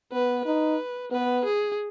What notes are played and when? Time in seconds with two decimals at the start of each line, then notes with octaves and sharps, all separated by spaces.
0.12 B3 B4
0.45 D#4 B4
1.11 B3 B4
1.45 G#4